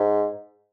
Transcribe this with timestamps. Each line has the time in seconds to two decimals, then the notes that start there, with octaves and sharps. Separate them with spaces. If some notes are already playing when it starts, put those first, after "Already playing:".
Already playing: G#2